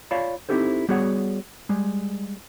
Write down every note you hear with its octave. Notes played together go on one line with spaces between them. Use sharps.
F4 C#5 D5 F5 A5 B5
C4 D#4 E4 G4 A4 C5
G3 B3 F#4 G#4 C#5 F#5
G3 G#3